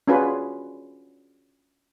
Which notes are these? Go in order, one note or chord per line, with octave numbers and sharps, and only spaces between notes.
C#4 D4 F4 F#4 G#4 B4